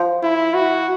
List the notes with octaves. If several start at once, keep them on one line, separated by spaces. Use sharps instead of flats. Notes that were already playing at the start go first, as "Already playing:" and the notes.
Already playing: F3
E4
F#4